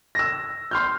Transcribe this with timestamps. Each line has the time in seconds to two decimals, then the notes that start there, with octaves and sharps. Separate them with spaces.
0.15 E6 A#6
0.71 C6 F6 G6